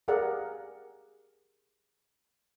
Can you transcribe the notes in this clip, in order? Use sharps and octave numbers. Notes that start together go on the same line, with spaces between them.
G4 G#4 A#4 D5 F5 F#5